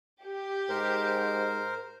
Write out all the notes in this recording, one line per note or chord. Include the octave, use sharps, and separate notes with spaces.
G4
G#2 A#4 C5